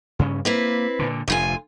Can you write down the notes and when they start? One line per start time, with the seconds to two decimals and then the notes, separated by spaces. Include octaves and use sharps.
0.19 G2 C#3 C#4
0.45 A#3 C4 E4 B4
0.99 A#2 D3
1.28 F1 D2 F4 G#5